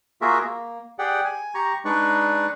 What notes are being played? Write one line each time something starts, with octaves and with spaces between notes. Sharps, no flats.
A#3 F4 F#4 G#4 A#4 E5
A#3
G4 G#4 D5 F#5 G5
G#5
G4 A#5 C#6
G#3 D4 D#4 B4 D5 C#6